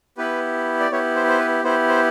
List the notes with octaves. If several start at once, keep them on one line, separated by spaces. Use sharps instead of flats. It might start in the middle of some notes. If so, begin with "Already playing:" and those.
B3 E4 G4 B4
D5
B3 E4 G4 C#5
C5
C5
B4
B3 E4 G4 C5
C5